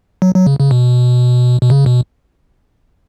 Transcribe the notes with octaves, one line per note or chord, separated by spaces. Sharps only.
F#3
F#3
C#3
C#3
B2
B2
C#3
B2